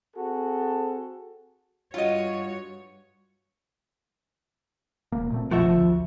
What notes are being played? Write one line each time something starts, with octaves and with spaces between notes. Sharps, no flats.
C4 F#4 G#4 A4
G2 F4 F#4 C#5 D#5
E1 E2 A#3
A#2 A3 C4
F1 B1 B2 F3 F#4 E5
G#1 D3
D2